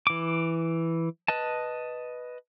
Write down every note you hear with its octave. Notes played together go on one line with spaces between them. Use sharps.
E3 D6
B4 D#5 A5